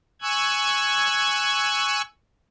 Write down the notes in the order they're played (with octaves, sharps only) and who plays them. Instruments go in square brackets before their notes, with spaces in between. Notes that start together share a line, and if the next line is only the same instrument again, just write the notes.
[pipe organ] G#5 C#6 E6 F#6 G#6